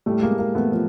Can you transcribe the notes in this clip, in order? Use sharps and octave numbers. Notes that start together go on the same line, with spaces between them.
A2 G3 A3
G#3 A#3
A2
G#3 A#3
E3 A3 B3
F3